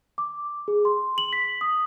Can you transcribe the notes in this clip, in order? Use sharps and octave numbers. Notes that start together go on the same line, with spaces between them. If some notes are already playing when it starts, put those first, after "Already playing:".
D6
G#4
C6
F#7
B6
D#6